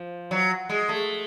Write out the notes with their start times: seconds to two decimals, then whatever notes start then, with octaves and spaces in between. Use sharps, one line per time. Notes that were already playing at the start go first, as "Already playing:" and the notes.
Already playing: F3
0.31 F#3
0.69 G#3
0.89 A3